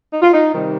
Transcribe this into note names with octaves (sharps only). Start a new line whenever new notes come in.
D#4
F4
D#4
C3 D#3 G3